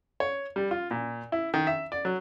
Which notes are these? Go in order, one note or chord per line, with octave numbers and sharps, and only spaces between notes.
C#5
G3
F4
A#2
E4
D#3
E5
D5
F#3